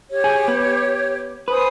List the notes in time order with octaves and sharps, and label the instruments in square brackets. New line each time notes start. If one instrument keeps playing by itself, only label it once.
[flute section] G4 C#5
[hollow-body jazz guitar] G#4
B3
[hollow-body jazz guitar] B4 [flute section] C5 G#5 D#6